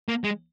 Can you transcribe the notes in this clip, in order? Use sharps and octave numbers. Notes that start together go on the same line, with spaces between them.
A#3
G#3